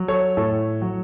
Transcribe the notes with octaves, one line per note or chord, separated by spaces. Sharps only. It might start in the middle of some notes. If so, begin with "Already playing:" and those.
Already playing: F#3
A4 C#5
A2 A4 C#5
F#3